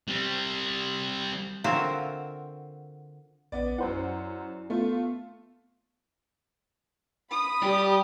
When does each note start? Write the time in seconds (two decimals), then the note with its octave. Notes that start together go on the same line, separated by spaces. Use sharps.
0.08 G3 C4
1.64 D3 C4 F4 F#4 A#4 E5
3.52 A#1 B3 D5
3.78 F#2 E4 C5 D5 F#5
4.70 A3 B3 F4
7.31 B5 D#6
7.63 G3 G4